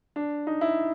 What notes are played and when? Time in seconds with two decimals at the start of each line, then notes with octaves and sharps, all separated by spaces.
0.16 D4
0.47 D#4
0.61 E4